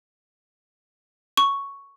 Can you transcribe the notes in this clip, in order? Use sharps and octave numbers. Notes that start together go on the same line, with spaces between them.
C#6